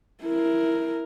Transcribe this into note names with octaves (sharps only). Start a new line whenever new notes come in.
E4 A#4